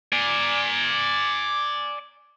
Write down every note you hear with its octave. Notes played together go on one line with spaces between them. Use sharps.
D5 G#5